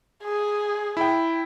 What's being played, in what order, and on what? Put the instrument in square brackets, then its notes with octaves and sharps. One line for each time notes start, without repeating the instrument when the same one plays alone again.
[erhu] G#4
[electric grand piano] E4 G5